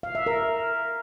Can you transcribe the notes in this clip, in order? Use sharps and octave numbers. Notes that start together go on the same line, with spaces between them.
F5
E5
A#4